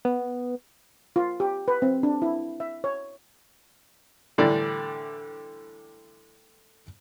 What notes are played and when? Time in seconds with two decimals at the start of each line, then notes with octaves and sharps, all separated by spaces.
0.05 B3
1.16 F4
1.40 G4
1.68 B4
1.82 C4
2.03 D4
2.22 E4
2.60 E5
2.84 C#5
4.38 A2 D3 E3 G3 D5